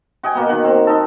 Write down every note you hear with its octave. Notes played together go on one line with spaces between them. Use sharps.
F#4 D#5 G5 G#5
B2 A#3 B3
D#3 F#5
C4
D#4 A4